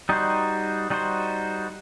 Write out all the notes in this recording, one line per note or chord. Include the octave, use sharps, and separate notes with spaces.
G3 D#4 F#4 C5
G3 D#4 F#4 C5